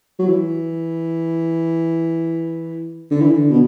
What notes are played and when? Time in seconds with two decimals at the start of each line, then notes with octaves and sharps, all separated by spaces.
0.19 F#3
0.27 E3
3.11 D3
3.21 E3
3.31 D3
3.51 B2